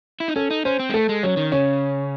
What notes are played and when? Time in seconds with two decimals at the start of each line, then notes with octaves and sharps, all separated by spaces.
0.20 E4
0.28 D#4
0.36 C#4 A4
0.51 D#4
0.65 C#4 C5
0.79 C4
0.90 G#3
0.94 A3 A4
1.09 G#3
1.23 F#3 C#4
1.37 D#3
1.52 C#3 C#4